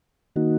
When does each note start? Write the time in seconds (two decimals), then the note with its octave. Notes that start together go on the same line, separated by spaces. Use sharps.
0.36 D#3 A#3 D#4 F#4